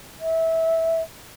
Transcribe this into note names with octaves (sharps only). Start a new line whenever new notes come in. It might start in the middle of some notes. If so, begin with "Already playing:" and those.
E5